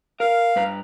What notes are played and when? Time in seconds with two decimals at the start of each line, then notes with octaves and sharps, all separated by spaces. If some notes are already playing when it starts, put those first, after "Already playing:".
0.20 A#4 F5
0.56 G2 B4 A#5